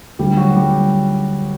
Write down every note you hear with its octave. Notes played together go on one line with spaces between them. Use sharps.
D2 D3 F#3 G3 G4
F#3 F#4
G3 G4